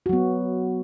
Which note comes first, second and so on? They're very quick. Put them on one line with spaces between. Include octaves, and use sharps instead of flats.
F#4 F#3 B3